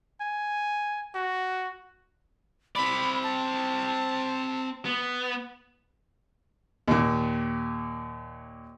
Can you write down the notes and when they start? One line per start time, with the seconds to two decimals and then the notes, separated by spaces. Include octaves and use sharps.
0.21 G#5
1.15 F#4
2.76 C4 D5 B5
3.24 A5
4.85 B3
6.88 D#2 A#2